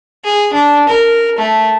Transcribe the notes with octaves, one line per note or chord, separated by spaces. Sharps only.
G#4
D4
A#4
A3